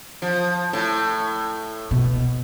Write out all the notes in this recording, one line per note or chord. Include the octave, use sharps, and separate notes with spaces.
F3
A2
B2